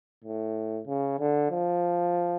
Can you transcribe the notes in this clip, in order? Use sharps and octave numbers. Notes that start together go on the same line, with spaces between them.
A2
C#3
D3
F3